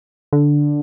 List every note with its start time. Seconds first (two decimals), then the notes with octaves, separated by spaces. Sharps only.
0.33 D3